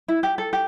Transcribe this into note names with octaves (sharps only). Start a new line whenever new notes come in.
E4
G4
A4
G4